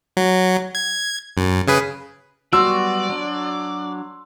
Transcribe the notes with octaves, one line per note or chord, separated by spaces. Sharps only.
F#3
G#6
F#2
C#3 G#4 B4
F#3 G3 B3 F#4 D5 C6 E6
F#3 D4